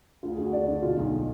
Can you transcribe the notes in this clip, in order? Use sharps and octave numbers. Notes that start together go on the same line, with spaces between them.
D2 F4
G#4
D2 F#4
D2 D5
D3
B2 F4
B1 D#4